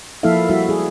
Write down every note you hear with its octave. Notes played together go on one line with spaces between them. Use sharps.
F3 A#3 E4 A4 E5 F5
G3 E4 F#4 E5
G#4